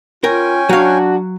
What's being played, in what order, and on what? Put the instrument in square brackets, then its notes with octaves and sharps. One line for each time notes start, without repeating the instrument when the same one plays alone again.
[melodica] C#4 G5 G#5 [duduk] F4 [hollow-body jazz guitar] A#4
[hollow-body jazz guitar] F#3 F5 [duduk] D4 [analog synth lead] F#4